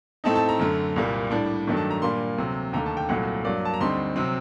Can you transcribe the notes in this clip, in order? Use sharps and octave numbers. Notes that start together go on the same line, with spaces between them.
A2 A3 C4 D#4 A5
A5
A#5
F#2 D3 A3
C2 A#2 G3 A#3
A2 G3 D4
G2 D#3 F#3 A3 D4
A5
A#5
A#2 G3 A#3 D4 C6
D2 C3 F#3
D#2 D3 A3 A#5
A5
G5
C2 A#2 F#3 A3 F#5
G2 F#3 A#3 D5
A5
A#5
D2 D3 G3 C4 D#4 C6
C3 F#3 C4